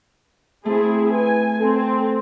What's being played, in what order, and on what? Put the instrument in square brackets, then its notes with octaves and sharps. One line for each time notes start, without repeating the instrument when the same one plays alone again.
[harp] A3 [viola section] C4 E4 G#4
[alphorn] B4 [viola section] G#5
[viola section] C4 [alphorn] A4